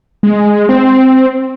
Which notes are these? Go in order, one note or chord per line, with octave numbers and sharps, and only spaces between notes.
G#3
C4